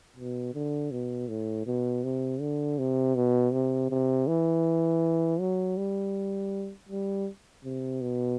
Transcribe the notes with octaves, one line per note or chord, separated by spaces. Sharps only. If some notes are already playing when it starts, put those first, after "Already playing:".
B2
D3
B2
A2
B2
C3
D3
C3
B2
C3
C3
E3
F#3
G3
G3
C3
B2